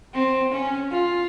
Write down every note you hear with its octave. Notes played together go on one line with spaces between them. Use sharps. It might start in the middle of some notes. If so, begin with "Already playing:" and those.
C4
C#4
F4